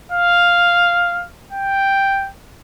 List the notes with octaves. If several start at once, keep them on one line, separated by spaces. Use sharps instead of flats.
F5
G5